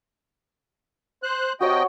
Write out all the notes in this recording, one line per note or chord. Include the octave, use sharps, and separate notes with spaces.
C5 F#6
C3 F#4 C#5 D#5 G5 A5